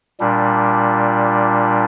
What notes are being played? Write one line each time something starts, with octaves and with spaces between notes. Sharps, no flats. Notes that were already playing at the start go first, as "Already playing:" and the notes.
A#2 G3 D4